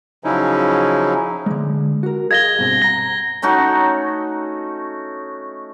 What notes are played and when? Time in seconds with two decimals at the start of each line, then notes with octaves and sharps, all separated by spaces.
0.24 C#3 F3 F#3 C#4 D#4 E4
1.46 D3 G#3
2.03 F#4 A#4
2.31 G#4 D#5 F5 G#6 A#6 G7
2.59 G2 B2 C4
2.82 F#5 A#5 A#6 G7
3.42 A3 C#4 D#4 F#4